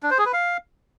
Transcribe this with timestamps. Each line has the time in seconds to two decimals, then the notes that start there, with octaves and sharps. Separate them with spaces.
0.03 D4
0.10 C5
0.18 G#4
0.26 B4
0.33 F5